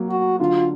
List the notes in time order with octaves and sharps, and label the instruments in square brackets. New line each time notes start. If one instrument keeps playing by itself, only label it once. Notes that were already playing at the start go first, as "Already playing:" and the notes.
Already playing: [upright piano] F#3 A#3
[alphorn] F#4
[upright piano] D3 [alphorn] F4